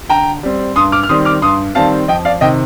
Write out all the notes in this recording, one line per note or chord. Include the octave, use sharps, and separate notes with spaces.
D3 G5 A#5
G3 C4
G2 C6 D#6
D6 F6
F6
D#3 G3 C4 C6 D#6
D6 F6
G2 C6 D#6
D#3 G3 C4 F5 A5
F2 D#5 G5
D5 F5
C3 D#3 D#5 G5